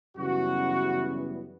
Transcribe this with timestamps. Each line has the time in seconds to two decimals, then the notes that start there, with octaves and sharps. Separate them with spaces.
0.16 F#2 C#3 E3 G3 B3 F#4